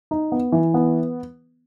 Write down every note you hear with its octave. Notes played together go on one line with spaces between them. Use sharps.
D#4
B3
E3
B3